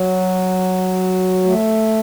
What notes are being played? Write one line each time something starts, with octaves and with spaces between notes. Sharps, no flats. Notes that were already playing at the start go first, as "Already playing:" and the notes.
Already playing: F#3
A3